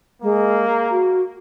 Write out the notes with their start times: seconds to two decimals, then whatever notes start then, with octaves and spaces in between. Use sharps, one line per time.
0.22 G#3 A#3
0.90 F#4